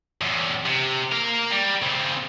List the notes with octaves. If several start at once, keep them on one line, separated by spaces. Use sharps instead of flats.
E2 A2
C3
A#4 F5
G3
C#3 C4